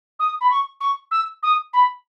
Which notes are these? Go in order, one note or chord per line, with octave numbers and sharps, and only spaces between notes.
D#6
B5
C#6
C#6
E6
D#6
B5